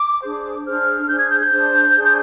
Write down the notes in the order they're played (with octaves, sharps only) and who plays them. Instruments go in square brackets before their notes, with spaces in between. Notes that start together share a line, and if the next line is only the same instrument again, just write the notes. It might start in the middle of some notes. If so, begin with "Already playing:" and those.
Already playing: [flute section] D6
D4 G#4 C5
D4 G#4 C5 F6
D4 G#4 C5 G6
G#6
G6
G6
D4 G#4 C5
D4 G#4 C5